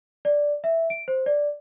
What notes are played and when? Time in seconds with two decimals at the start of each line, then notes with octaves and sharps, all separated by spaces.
0.25 D5
0.64 E5
0.90 D7
1.08 C5
1.26 D5